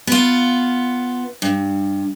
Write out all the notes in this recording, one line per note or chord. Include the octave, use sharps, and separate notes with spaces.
B3 F4
G2